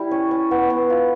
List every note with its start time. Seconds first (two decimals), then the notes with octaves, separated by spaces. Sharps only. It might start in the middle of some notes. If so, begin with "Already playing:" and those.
Already playing: G3 E4
0.11 C#4
0.31 C#4
0.51 B3
0.70 B3
0.90 F4